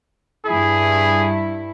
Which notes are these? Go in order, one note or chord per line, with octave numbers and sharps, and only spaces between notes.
G2 E4 G#4